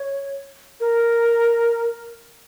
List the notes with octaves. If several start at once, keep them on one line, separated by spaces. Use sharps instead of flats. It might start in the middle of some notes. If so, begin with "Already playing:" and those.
Already playing: C#5
A#4